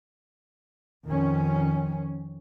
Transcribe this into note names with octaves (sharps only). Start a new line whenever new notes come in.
F2 D#3 C#4